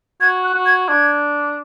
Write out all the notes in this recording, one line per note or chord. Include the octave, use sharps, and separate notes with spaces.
F#4 G#6
F#6
F#4
G#6
D4 G#6